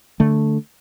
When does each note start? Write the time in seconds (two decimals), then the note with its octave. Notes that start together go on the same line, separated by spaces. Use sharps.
0.20 D3 A3